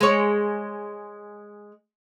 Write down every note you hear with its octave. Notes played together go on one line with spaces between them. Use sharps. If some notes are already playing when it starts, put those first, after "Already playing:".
G#3 C#5